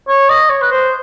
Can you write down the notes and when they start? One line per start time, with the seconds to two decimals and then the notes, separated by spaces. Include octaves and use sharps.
0.08 C#5
0.29 D#5
0.50 C#5
0.62 B4
0.71 C5